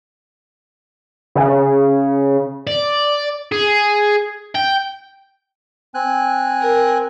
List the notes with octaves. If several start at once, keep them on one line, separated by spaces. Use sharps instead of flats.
C#3
D5
G#4
G5
C4 G#5 F#6
A#4